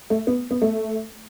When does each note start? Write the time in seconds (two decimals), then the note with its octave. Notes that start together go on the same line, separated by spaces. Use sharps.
0.10 A3
0.27 B3
0.51 B3
0.62 A3